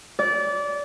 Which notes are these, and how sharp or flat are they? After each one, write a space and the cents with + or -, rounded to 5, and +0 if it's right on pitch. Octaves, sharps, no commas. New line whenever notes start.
D5 -25